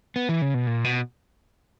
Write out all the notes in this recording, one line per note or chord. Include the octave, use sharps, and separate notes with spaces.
B3
E3
C#3
B2
A#2
B2